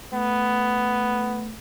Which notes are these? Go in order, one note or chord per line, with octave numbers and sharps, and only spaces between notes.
A3 B3